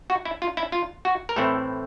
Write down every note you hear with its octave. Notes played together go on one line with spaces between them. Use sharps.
F#4
E4
F4
E4
F4
F#4
A#4
A2 E3 A3 C4 E4 A4